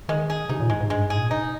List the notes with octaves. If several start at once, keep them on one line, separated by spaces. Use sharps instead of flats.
D#3 G#3
G#4
C3 D#4
A#2
G#2 G#3
G#2
G2 G#3
G#2
G#4
A#2
C3 D#4